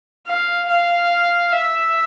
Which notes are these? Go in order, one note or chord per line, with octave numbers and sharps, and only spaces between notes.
F5
F5
E5